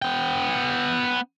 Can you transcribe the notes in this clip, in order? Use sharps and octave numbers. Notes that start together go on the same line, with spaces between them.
B3 G5